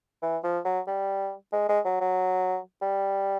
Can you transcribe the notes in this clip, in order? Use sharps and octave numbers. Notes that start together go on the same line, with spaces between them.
E3
F3
F#3
G3
G#3
G#3
F#3
F#3
G3